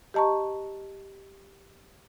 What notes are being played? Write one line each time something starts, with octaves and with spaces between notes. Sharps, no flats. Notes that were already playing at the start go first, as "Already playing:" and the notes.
G4 D#5 A5 A#5 C#6